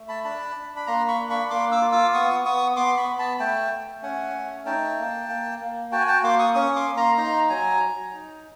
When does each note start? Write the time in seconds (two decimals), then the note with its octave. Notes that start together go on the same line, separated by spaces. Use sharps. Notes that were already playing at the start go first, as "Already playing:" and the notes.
Already playing: A3
0.08 A5 B5
0.24 D4 A5 B5
0.56 D4
0.76 B5
0.87 A#3 A#5 C6
1.08 B5 C#6
1.20 D4
1.30 B5 C#6
1.50 A#3 C6 D6
1.72 D6 E6
1.82 F4
1.92 D6 E6
2.14 B3 C#6 D#6
2.45 B3 C#6 D#6
2.76 B3 C6 D6
2.97 B5 C#6
3.09 B3
3.18 A5 B5
3.39 A3 G5 A5
3.71 A3
4.02 C#4 F#5 G#5
4.34 A3
4.65 D#4 G5 A5
4.98 A#3
5.29 A#3
5.60 A#3
5.92 F#4 G5 A5
6.00 G#5
6.07 G5 A5
6.23 A#3 C6 D6
6.39 C#6 D#6
6.55 C#4 C#6 D#6
6.76 C6 D6
6.87 A#3
6.97 A#5 C6
7.17 D#4 A#5 C6
7.50 F#3 G#5 A#5
7.81 F#3
8.13 D#4